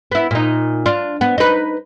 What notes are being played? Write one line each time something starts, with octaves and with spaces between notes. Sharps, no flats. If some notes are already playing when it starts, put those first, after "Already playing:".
B3 E4
A#2 D#4
D4 F4
B3
D#4 B4